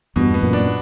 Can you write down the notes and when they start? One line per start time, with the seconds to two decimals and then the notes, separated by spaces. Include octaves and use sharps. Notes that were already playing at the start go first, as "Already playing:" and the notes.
0.16 E2 G2 B2
0.34 B3
0.43 F#2 A#2
0.53 D4